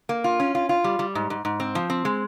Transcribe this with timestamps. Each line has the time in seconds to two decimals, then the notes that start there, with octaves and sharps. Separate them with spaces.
0.09 A#3
0.24 F4
0.40 C#4
0.55 F4
0.69 F4
0.84 G3
0.99 G3
1.15 G#2
1.30 G#2
1.45 G#2
1.60 C4
1.75 F3
1.90 C4
2.05 G#3